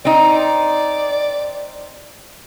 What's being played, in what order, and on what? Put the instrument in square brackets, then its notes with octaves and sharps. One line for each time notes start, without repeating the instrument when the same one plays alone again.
[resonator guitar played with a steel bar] C4 D#4 [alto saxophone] D5